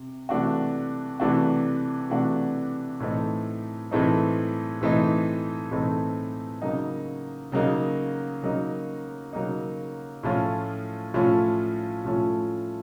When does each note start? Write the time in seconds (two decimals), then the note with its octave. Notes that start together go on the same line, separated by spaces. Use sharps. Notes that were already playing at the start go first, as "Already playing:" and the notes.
Already playing: C3
0.29 C3 E3 A3 D4 F#4
1.20 C3 E3 A3 D4 F#4
2.10 C3 E3 A3 D4 F#4
3.00 A2 E3 A3 C4 D#4
3.91 A2 E3 A3 C4 D#4
4.81 A2 E3 A3 C4 D#4
5.71 A2 E3 A3 C4 D#4
6.62 C#3 F#3 A#3 D#4
7.52 C#3 F#3 A#3 D#4
8.43 C#3 F#3 A#3 D#4
9.33 C#3 F#3 A#3 D#4
10.23 A2 F3 A3 C#4 F4
11.14 A2 F3 A3 C#4 F4
12.05 A2 F3 A3 C#4 F4